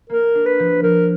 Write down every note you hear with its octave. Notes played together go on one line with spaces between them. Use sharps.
A#3 A#4
D4
B4
F3
F3 A#4